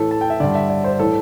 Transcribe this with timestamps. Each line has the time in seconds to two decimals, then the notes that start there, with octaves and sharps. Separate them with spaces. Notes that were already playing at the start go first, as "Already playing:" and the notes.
Already playing: A2 E3 A4
0.11 A5
0.21 G5
0.30 E5
0.40 G2 D3 D5
0.55 E5
0.69 D5
0.84 C5
0.99 A2 E3 A4